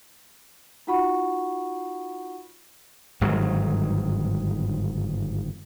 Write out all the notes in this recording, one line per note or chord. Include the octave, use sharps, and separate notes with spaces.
D#4 F4 F#4 F#5 B5 C#6
G1 G#2 D#3 F#3